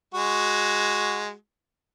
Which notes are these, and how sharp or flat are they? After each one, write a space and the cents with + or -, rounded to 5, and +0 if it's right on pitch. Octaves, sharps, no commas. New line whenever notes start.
G#3 +0 F#4 +0